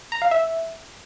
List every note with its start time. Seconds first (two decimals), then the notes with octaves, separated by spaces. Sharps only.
0.12 A#5
0.22 F5
0.31 E5